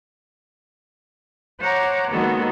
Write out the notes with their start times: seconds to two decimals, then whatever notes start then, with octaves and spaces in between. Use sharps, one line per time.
1.60 C5 C#5 F#5 A#5 D6
2.11 D#3 G#3 A#3 B3 F#4 A4